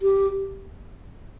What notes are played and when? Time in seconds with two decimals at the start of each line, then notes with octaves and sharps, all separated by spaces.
0.02 G4